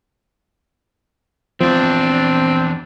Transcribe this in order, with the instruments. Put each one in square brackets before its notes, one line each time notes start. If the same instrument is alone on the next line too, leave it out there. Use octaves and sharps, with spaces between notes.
[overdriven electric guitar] E2 D4 [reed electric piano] F3 [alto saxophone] C4